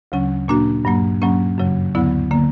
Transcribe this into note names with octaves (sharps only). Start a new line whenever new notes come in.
D2 C#3 F#3 C#4
A#2 A#3 D4 F#4
G2 F#3 A#3
G2 F#3 A#3 C#4
F#2 C#3 F#3
D2 D3 F#3 B3 E4
D3 A#3